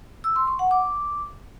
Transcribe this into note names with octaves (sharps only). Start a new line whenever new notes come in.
E6
C6
C#6
F#5
D6